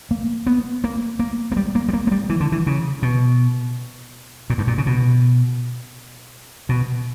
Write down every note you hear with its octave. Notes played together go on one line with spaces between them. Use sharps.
A#3
B3
A#3
A#3
A#3
G3
A#3
G3
A#3
A#3
G3
E3
D3
E3
C#3
B2
A#2
G2
A#2
C#3
B2
B2